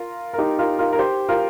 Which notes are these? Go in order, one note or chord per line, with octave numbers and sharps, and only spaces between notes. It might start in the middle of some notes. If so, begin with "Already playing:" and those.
Already playing: F4 A#4
A#4
D#4 G4
F4 A#4
F4 A#4
A#4
G4 C5
F4 A#4